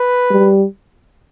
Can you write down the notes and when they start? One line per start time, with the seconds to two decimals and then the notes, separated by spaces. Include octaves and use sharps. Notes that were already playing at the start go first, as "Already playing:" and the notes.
Already playing: B4
0.30 G3